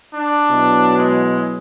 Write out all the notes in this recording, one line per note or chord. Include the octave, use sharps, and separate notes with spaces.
D4
B2 F#3 E4
G#3